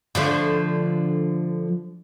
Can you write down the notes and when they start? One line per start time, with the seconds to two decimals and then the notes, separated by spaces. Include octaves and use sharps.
0.15 D3 F3 A3